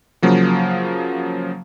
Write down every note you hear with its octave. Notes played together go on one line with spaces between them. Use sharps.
C#3 F3 F#3 A#3